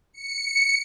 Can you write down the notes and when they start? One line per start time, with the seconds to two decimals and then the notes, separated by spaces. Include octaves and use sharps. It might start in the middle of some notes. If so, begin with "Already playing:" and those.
0.12 C#7